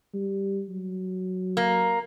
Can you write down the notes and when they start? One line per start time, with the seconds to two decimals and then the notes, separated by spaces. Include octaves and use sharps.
0.14 G3
0.69 F#3
1.57 A#3